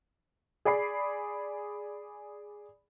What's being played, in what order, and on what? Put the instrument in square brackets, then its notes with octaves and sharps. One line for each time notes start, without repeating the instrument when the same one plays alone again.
[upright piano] G#4 D5 B5 C7